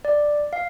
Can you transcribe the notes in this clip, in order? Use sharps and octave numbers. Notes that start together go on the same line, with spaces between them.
D5
F5